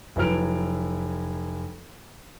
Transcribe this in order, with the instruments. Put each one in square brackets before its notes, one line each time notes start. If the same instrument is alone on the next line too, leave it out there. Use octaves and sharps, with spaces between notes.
[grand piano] F1 F#3 E4 B4 F6 D7